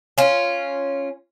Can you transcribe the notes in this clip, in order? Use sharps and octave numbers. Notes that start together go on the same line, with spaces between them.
C#4 F4